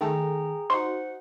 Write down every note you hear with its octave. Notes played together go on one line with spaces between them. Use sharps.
D#3 A3 G#4 A4 G5 A#5
D#4 F#4 C5 F#5 C6